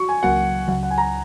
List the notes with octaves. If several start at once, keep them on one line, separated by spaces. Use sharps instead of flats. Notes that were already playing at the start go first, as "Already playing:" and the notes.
Already playing: F#4 C#6
G#5
C#2 C#3 F#3 A#3 F#4 F#5
C#2 C#3 F#3 F#5
F#5
G#5
A#5